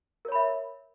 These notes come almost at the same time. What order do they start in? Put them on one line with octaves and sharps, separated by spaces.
A#4 C#5 B5 E5